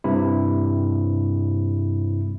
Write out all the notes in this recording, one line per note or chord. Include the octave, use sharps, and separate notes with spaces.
G2 C3 E4